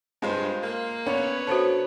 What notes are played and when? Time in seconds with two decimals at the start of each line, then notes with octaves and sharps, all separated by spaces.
0.22 G2 G#3 F4 C5
0.63 A#3
1.06 B3 C#4 B4 C#5 D5
1.47 D3 F#4 C5 A5